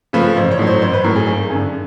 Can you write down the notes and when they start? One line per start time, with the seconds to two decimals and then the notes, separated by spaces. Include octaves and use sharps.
0.13 C#3 F3 A3 B4
0.36 A1 C5
0.51 C#5
0.59 A2 F#3
0.67 C5
0.82 A1 C5
0.93 B4
1.04 A2 F#3 A#4
1.16 G#4
1.27 G#1 G#4
1.50 F#2 G#4
1.54 D3